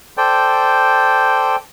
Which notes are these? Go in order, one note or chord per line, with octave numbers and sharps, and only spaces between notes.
A4 C5 D5 G5